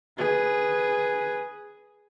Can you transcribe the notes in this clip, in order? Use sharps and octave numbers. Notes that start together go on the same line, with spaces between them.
G#4 B4